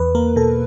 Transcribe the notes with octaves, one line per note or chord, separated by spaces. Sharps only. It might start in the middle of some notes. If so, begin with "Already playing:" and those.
Already playing: E2 B4
A#3 A#4
B2 A4